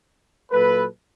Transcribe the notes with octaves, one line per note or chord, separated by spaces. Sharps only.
A#2 F#3 A#3 A4 B4